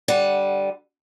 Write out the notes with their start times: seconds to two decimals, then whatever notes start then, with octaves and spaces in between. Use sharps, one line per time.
0.08 D3 G3 F#5